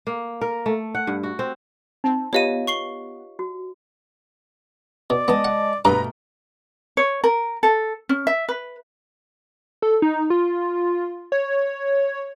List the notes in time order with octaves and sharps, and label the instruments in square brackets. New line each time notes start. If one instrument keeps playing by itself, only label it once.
[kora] A#3
A#4
A3
F#5
G2
F#4
C4
[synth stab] C4 [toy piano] D#4
[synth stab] B3 [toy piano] F4 G4 F5 [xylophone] C#5 D#5 D#7
[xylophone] C#6 C7 G7
[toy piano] F#4
[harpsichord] B2 [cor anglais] D5
[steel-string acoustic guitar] G#3 D#5 A5 [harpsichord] B3
[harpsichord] F#5
[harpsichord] G2 D6 [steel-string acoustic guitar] B2 A3 A#3 [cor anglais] B4 [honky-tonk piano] A#5
[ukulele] C#5
A#4
A4
C#4
E5
B4
[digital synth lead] A4
D#4
F4
C#5